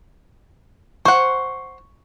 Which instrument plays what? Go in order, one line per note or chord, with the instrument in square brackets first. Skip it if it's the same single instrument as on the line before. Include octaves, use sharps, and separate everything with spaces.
[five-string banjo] C5 F#5 [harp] C#6